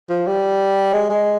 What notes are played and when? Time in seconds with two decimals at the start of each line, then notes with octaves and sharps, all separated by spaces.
0.10 F3
0.27 G3
0.94 G#3
1.10 G#3